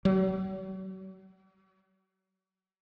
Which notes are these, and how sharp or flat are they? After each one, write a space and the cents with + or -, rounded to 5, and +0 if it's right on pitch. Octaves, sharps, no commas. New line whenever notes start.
F#3 +40